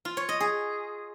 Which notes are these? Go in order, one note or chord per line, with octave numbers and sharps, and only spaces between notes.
F4
C#5
D#5
G#4